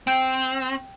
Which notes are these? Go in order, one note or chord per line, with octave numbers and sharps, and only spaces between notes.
C4 G5 G6